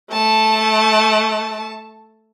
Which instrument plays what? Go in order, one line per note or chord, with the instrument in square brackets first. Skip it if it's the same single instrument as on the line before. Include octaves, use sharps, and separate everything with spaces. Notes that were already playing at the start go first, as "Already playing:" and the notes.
[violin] A3 A5